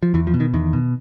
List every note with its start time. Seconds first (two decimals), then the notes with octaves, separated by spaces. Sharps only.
0.03 F3
0.14 E2 E3
0.27 F3
0.34 B2
0.40 D#3
0.54 E2 D#3
0.73 B2